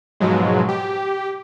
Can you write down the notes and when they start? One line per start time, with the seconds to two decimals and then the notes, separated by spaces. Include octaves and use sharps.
0.20 G#2 B2 F3 F#3 G#3
0.69 G4